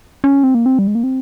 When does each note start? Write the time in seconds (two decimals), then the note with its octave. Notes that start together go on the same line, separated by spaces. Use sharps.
0.24 C#4
0.44 C4
0.55 A#3
0.66 C4
0.79 G3
0.87 G#3
0.95 A#3
1.04 C4